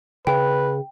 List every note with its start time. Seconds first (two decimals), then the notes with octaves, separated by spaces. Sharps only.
0.27 C#3 B4 G5